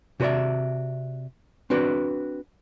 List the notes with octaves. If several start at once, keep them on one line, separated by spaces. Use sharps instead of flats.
C3 F#4 B4 C#5 D5 E5
C4 D4 F#4 B4